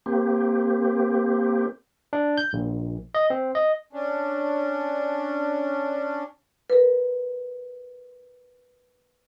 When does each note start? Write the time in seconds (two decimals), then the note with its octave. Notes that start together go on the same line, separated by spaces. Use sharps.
0.06 A#3 C4 G4
2.13 D4
2.38 G6
2.53 A#1
3.15 D#5
3.30 C4
3.55 D#5
3.93 C#4 D4
6.70 A#4 B4